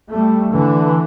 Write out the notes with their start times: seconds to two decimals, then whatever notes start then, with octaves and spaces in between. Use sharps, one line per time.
0.12 G3 A3
0.51 D3 E3